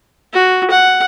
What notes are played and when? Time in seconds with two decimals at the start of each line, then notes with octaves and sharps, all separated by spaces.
0.33 F#4
0.71 F#5